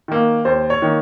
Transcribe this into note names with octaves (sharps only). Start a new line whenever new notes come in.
D#3 A#3
D#2 C5
C#5
D#3 A#3